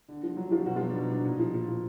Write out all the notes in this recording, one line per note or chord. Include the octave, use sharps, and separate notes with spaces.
D3
F3
D3 F#3 F#4
F3 F4
B2 F#3 F#4
F3 F4
F#3
D4
B2 D#4
F#3 D4
A#2 D#4
F3
A#2
F3